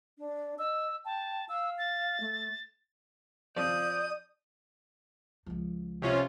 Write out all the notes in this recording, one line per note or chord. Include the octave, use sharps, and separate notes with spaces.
D4
D#5 E6
G5 A5
F5 E6
A6
A3
F3 C4 F4 D5 D#6 G6
C#2 F3
C3 C#4 F4